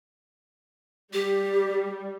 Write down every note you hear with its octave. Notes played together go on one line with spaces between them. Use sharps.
G3 G4